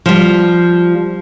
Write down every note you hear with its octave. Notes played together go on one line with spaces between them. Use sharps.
F3 G3